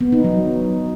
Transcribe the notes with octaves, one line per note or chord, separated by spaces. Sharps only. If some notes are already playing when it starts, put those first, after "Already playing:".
B3
D#4
F#3